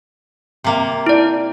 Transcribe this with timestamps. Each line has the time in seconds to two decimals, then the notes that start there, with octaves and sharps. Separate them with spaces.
0.64 C3 A#3
1.06 E4 D5